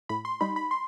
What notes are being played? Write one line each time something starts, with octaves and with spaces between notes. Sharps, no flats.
A2 B5
C6
G3 D#4 B5
B5
C6